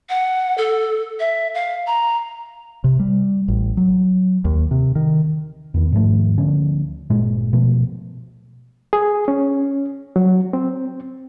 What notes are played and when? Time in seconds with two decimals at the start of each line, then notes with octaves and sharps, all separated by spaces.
0.09 F#5
0.58 A4
1.20 E5
1.54 F5
1.87 A#5
2.84 C3
2.99 G3
3.48 A1
3.77 F#3
4.45 D#2
4.71 C3
4.95 D#3
5.74 E2 D#3 B3
5.92 G#2 D#3 F3 A3
6.38 D2 D3 F3 C#4
7.10 G1 A#2 G#3
7.53 B2 F3 A3
8.93 G#4
9.28 C#4
10.16 F#3
10.53 C4